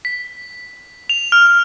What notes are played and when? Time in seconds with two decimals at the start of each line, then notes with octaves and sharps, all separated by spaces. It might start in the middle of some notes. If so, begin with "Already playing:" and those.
0.05 B6
1.10 F7
1.32 F6